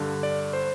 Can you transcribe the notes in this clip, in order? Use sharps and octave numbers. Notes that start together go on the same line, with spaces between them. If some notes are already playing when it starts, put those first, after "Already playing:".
Already playing: G2 D3
D5
C5